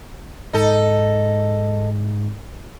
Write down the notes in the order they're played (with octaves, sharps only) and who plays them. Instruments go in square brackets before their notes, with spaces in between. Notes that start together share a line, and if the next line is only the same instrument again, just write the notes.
[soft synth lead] G#2 [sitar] D#4 A4